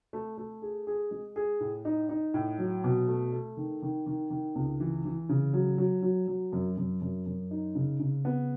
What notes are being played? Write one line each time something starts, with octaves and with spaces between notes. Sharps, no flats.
A3
A3
G#4
G#4
G#3
G#4
A2
D#4
D#4
A2
F#3
B2
A3
A3
D#3
D#3
D#3
D#3
C#2
E3
E3
C#3
F#3
F#3
F#3
F#3
F#2
F#2
F#2
F#2
D#4
C#3
C#3
B3